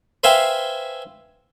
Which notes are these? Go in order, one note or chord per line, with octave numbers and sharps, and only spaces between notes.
B4 C5 E5 F5 G5 G#5